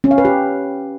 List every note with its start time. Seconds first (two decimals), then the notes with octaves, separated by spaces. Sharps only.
0.04 C#4
0.11 F5
0.18 B4
0.25 G4